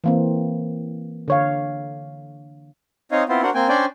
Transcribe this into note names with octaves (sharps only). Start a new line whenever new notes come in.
E3 A#3 C4
D3 C#5 F5
C4 D#4 C#5 D#5 F5
B3 C4 E4 F4 C5
D4 F#4 A#4 C5 F#5
A#3 C4 G5 G#5
C#4 D4 C5 D5 G5 G#5